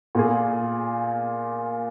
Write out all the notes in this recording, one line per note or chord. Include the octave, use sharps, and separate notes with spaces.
A#2 A#3 F4 G#4